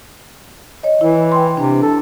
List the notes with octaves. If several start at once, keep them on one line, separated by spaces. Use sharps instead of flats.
C#5 D#5
E3 E4
G5 C6
C3 D4
A4